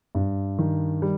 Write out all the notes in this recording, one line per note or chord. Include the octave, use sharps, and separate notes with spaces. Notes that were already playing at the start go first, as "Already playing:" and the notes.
G2
D#3
G3